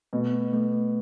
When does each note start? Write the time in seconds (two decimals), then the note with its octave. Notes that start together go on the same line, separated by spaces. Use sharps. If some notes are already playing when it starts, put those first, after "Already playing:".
0.13 B2 A3
0.53 A3